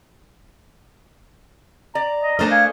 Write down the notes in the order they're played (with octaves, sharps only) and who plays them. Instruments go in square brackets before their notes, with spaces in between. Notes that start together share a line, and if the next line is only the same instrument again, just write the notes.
[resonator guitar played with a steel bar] D5 [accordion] A#5
[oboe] D#5
[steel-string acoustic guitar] A3 D4 D#5 [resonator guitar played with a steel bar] A#4 C5 A5 [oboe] A#5
[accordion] F5 [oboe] G#5